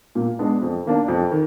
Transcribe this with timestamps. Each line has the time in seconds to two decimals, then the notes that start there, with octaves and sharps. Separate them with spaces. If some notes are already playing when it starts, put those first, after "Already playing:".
0.15 A#2
0.39 G#3 B3 D4
0.62 F2
0.85 D#3 A#3 D4
1.08 F2
1.31 D#3